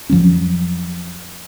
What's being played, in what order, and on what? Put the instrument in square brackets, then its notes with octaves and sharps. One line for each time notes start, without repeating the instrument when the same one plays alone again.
[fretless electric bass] F2 F3 F#3 C#4